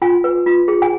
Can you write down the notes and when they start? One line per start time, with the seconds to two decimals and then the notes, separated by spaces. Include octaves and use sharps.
0.02 F4 G#5
0.24 B4
0.46 F4
0.68 G#4
0.82 G#5